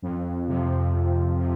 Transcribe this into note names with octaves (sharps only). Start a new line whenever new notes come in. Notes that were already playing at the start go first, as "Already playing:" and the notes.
F2
C3 F3
F2
C3 F3